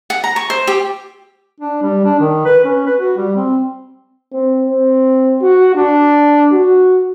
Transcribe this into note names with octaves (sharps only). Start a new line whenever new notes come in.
F#5
A#5
C#6
C5
G4
D4
G3
D4
D#3
B4
C#4
B4
F#4
G3
C4
C4
C4
F#4
D4
F#4